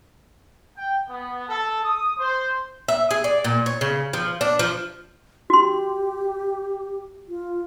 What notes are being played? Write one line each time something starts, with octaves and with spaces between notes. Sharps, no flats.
G5
B3
A4
D#6
C5
E5
G#4
D5
A#2
C#5
C#3
F3
D4
F3
F#4 G4 C6
F4